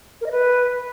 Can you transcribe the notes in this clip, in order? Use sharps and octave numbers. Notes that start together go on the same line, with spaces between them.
A#4
D#5
B4